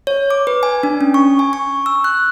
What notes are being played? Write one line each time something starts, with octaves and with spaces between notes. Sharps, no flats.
C#5
D6
B4
G#5
D4
C#4
C#6
G#5
C#6
E6
F#6